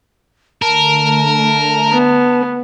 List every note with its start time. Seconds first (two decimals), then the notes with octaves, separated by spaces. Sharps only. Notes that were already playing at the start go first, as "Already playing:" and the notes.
0.62 D3 A3 A#4 A5
1.92 B3